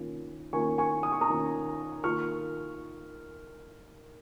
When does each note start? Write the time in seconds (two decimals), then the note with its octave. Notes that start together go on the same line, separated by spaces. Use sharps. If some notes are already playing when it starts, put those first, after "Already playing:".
Already playing: D#3 A#3 C#4 F4
0.53 D#3 A#3 C#4 F4 G#5 C#6
0.78 G#5 C#6
1.03 D#6
1.12 C#6
1.21 A#5 D#6
1.28 D#3 A#3 C#4 F4
2.04 D#3 A#3 F4 C#6 F6